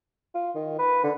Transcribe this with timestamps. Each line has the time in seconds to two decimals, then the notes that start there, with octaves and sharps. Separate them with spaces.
0.34 F4
0.55 D#3
0.79 B4
1.04 D3